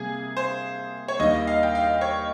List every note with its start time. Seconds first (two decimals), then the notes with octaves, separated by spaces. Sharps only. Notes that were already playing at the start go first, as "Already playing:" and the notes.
Already playing: C3 G3 A#3 G#4
0.37 C5
1.08 C#5
1.19 D#2 D#3 G3 D#5
1.47 F5
1.63 G5
1.75 F5
2.01 C#5